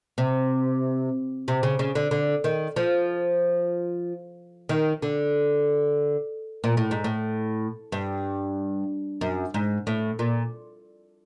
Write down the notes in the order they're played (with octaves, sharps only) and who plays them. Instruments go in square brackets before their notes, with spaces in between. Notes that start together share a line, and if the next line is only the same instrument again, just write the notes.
[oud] C3
C3
C#3
C#3
D3
D3
D#3
F3
D#3
D3
A#2
A2
G#2
A2
G2
F#2
G#2
A2
A#2